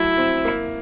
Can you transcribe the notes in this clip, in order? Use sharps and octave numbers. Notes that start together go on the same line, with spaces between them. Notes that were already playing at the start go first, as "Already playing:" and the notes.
Already playing: F#3 A3 E4
C4
A#3